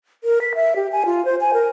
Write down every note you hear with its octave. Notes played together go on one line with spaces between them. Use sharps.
A#4
B6
E5
G4
G#5
F4
C5
G#5
A#4